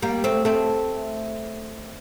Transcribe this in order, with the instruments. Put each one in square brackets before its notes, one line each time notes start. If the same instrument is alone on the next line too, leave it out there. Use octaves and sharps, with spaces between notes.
[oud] G3 A#3
A3 C4
A3 C4